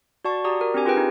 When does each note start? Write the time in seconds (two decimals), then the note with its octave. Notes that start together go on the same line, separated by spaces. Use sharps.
0.25 F#4 D5 A5 C#6
0.44 F#4 G4 D5 A#5 D#6
0.61 A#4
0.74 C4 D4 G4 G#5
0.86 F4 G4 G#4 B4 G5
0.97 D#4